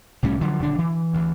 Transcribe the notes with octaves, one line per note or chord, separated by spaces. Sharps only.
C2 A2 G3 C#4
D3 F3 F#3
D#1 D3 D4
E3
D2 E3